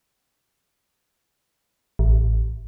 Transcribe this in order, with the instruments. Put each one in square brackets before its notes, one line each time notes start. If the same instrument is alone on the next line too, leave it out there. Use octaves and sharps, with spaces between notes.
[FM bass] A1